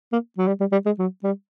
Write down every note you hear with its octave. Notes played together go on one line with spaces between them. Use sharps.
A#3
F#3
G3
G3
G3
G#3
F#3
G3